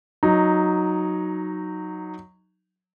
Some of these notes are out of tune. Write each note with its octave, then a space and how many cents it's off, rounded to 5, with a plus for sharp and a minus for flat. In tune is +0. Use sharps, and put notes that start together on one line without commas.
F#3 -5 D#4 +0